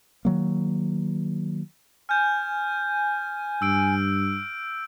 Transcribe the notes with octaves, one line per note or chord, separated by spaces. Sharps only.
D#3 F#3 A#3
G#5 F6 G6
G2 E6 D7